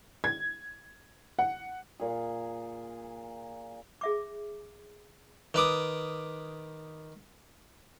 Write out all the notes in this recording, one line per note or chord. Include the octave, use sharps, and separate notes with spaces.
G#6
F#5
A#2 G#4
G#4 E5 D6
D#3 B4 D6 D#6